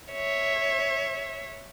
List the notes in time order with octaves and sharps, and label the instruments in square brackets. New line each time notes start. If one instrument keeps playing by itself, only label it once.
[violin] C#5 E5